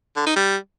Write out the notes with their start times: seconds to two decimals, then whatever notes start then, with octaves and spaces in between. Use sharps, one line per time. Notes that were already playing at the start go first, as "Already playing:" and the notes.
0.16 D3
0.26 D#4
0.36 G3